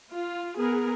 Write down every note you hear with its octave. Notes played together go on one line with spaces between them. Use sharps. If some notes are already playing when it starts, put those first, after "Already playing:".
F4
B3 G#4 A#4